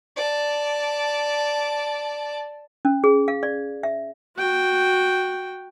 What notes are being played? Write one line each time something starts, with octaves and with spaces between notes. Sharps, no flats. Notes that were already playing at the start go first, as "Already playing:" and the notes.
D5 A5
C#4
G#4
F5
D5
E5
F#4 G5